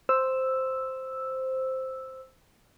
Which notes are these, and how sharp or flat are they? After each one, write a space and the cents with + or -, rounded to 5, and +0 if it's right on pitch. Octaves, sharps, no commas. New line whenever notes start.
C5 +0 E6 +0